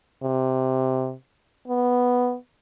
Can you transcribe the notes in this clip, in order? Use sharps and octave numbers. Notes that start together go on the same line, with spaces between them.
C3
B3